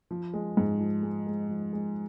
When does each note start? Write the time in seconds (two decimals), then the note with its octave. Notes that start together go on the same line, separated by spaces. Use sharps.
0.11 F3
0.34 G#3
0.57 G#2
0.80 F3
1.03 G#3
1.27 G#3
1.49 F3
1.73 G#3